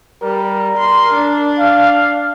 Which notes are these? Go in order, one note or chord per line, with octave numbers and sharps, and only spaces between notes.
G3 A#4
C6
D4
F5